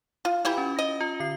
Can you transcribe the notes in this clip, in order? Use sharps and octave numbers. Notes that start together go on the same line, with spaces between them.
F4
E3 E4 F4 G4 B5
C#4
D#5
F4
D3 C7